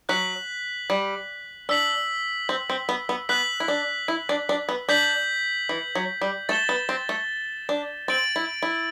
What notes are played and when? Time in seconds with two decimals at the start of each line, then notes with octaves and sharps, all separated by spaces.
0.09 F#3 F#6 B6 F#7
0.90 G3
1.69 D4 E6 B6 F#7
2.49 C4
2.70 C4
2.89 B3
3.09 B3
3.29 B3 F#6 B6 F#7
3.60 E4
3.68 D4
4.08 E4
4.29 D4
4.49 D4
4.69 B3
4.89 D4 G6 B6 F#7
5.69 E3
5.95 F#3
6.21 G3
6.49 A3 A6 E7 G7
6.69 B3
6.89 C4
7.09 A3
7.69 D4
8.08 C4 A6 D7 F#7
8.36 E4
8.63 E4